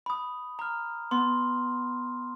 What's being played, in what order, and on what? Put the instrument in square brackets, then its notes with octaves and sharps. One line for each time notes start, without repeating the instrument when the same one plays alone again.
[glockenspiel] B5 D#6
A#5 F6
[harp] B3 [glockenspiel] C6